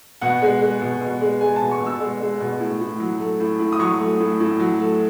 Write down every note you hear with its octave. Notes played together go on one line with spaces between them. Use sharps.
B2 F#5
G#3
G#3
B2
B2
G#3
G#3 G#5
B2 A5
C#6
B2
E6
G#3
G#3
B2
A2
A2
F#3
A3
A2
A2
D#6
F#3 C#6
A3
A2
A2
F#3
A3